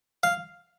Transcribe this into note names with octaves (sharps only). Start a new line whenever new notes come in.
F5